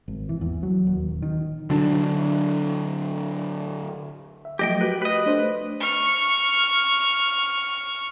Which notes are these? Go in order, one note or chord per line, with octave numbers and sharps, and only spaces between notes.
G#1
E3
E2
F#3
D#1
D#3
D3 F#3 D4
E5
F3 F#3 A3 G4 D#5 G5
F#4 G4 A#4 B4
B4 D#5
A3 D4 C5
C#6 F6